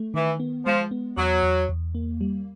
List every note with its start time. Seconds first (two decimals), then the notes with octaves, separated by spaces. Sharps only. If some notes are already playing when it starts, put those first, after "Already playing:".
Already playing: A3
0.14 D#3 E3
0.40 B3
0.66 F3 G#3
0.91 B3
1.17 E2 F#3
1.43 E2
1.69 E2
1.95 A#3
2.21 G3